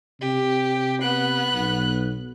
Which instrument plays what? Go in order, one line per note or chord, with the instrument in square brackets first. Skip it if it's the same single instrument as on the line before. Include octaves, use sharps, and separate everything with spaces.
[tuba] C3 [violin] G4
[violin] B3 F#6
[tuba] B1